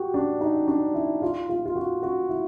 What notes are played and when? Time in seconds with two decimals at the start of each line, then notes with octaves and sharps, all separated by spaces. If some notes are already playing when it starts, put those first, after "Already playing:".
Already playing: F#4 G4
0.14 D4
0.41 D#4
0.68 D4
0.95 E4
1.22 F4
1.49 F4
1.66 F4
1.76 F#4
2.03 F#4
2.29 E4